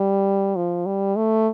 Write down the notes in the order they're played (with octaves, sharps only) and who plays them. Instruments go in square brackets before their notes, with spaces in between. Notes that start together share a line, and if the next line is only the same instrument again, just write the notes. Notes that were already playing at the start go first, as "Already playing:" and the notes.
Already playing: [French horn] G3
F3
G3
A3